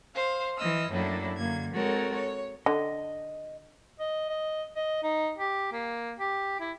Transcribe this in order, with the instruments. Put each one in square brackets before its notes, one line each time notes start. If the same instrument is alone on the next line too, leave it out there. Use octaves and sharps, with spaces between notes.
[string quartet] C5 F5
E3 D#5 E6 F6
F#2 A2 A#3 D4 E4
F#2 D3 A#3 G#6
G#3 C4 F#4 A4 A#4 C#5
C#5
[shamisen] D3 [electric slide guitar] D#5
[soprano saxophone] D#5
D#5
D#5
D#4
G4
A#3
G4
E4